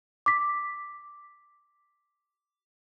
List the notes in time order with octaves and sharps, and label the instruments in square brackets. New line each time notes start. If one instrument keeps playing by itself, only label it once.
[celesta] D6 B6